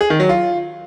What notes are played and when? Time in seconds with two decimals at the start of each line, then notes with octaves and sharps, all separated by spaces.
0.01 G#4
0.10 D#3
0.20 F#3
0.29 F4